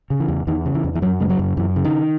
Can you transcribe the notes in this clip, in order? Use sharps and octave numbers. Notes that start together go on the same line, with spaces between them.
C#3
E3
E2
E2 D#3
C#3
E3
E2
E3
F#2 F#3
C#3 G#3
F#3
F#2
F#2 E3
C#3
D#3